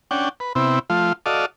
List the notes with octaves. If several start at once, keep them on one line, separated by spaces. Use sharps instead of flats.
C#4 D4 F#5 G5
B4
C3 B3 C4 E4
F3 A3 F4
F#4 A4 D5 D#5 F5